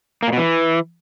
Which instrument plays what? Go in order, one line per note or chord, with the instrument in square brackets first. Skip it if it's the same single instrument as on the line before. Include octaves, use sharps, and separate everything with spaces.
[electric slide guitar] A#3
A#2
B2
E3